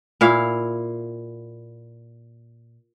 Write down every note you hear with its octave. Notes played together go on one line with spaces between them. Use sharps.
A#2 E4 F5